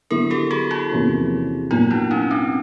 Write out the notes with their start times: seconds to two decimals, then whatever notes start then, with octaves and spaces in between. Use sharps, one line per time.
0.11 D3 F#3 B3 E4 G#4 A#4
0.30 G4 A4
0.51 F#4 G#4
0.71 E4 F#4
0.91 E2 C3 F3 A#3 C#4
1.71 A#2 F#3 B3 D#4 F4
1.91 D4 E4
2.11 C#4 D#4
2.31 C4 D4